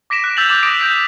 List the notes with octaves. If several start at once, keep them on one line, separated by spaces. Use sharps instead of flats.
D6 A#6 B6 D7 E7
F#6 D7
E6 G6 A6 B6 F7 F#7
D6 E6 G6 E7 F#7
D6 D#6 A#6 B6 D7
G6 B6 F#7